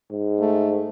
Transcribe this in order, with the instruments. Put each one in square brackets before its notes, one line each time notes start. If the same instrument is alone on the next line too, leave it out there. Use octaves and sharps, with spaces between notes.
[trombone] G#2
[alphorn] A3